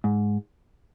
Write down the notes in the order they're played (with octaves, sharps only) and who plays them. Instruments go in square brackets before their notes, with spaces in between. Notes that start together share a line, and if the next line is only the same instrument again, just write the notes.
[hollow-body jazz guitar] G#2